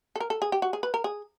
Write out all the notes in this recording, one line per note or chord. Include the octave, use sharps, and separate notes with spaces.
A4
A#4
A4
G#4
G4
F#4
G#4
B4
A#4
G#4